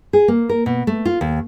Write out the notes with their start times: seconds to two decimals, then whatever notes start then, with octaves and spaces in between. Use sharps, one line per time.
0.13 G#4
0.28 A#3
0.49 A#4
0.66 B2
0.87 A3
1.05 F4
1.21 D#2